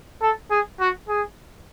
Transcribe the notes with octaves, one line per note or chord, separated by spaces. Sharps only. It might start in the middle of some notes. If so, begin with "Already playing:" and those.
A4
G#4
F#4
G#4